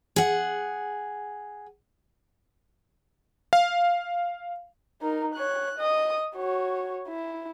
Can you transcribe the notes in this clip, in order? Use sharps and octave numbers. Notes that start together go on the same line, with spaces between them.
G#4 F#5
F5
D#4 A#4
C#5 F#6
D#5 D#6
F#4 C#5
E4